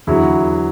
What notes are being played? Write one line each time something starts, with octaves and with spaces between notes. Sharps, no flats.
E2 D3 F#3 E4